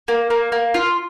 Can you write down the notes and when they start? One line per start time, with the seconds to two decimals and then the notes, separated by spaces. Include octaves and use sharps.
0.08 A#3
0.30 A#3
0.52 A#3
0.74 F4